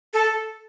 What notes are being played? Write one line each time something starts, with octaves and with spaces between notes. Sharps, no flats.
A4